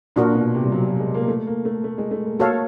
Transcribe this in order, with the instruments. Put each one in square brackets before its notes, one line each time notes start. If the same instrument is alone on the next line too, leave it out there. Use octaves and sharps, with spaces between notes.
[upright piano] A#2 [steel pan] D4 F#4 A#4
[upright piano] B2
C3
G3
F#3
F#3
G#3
A#3
A3
A#3
A3
A3
G#3
A3
A#3
[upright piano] A#3 [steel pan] F#4 A4 C#5 F5